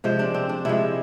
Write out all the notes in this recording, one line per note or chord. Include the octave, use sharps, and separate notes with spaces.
C3 F3 G#3 C5
D4
C4
D4
C3 F3 G#3 E4